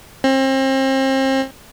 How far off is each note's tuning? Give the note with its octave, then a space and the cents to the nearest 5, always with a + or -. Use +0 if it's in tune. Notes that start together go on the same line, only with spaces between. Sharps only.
C4 +35